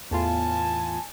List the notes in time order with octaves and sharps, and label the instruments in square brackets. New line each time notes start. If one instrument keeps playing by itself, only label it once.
[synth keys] E2 A2 F4 [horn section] G#5 A5